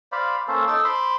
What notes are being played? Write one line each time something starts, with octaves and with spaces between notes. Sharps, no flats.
C5 D5 F5 B5
A#3 C#4 A4 C5
D#4 A4 D6 E6
C5 B5 C6 D6